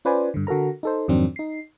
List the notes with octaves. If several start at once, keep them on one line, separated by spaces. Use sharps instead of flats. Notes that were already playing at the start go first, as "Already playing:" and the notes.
C#4 F4 B4 C5 D5 G#5
G2 D3
D3 F#4 A4 A#4 A#5
D#4 A4 C5
F2 G#2 D#3 F#3 C4 D4
D#4 C7